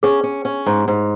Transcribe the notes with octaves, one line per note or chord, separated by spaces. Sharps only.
C#4 G#4
C#4
C#4
G#2
G#2